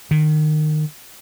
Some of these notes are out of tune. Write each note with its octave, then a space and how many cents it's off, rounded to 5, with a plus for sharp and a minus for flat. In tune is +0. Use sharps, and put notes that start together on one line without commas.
D#3 -25